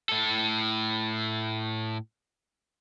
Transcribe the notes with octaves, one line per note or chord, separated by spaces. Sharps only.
A2 A4